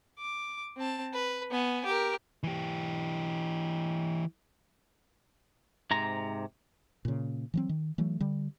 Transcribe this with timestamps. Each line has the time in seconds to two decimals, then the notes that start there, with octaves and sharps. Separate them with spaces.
0.19 D6
0.76 C4 A5
1.14 B4
1.51 B3 G#5
1.85 G4 A#4
2.43 E3 G4
5.91 G#2 C3 A#5
7.05 A#2 C#3
7.54 E3 F#3 C4
7.69 D#3
7.98 E3 F#3 A3
8.20 D3 G3